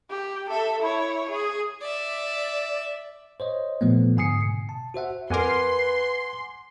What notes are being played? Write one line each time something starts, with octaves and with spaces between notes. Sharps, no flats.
G4
A4 E5
E4 C#5
G#4
D5 E5
C5 C#5 D#5
A#2 F3 A3 B3
G#2 D3 G#5 D#6 C7 C#7
B2
A5
F#4 C5 E5 F#5
F2 A#4 B4 F#5 G#5 C6 D6